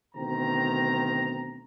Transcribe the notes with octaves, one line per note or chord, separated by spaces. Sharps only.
D2 B2 D#3 C4 A#5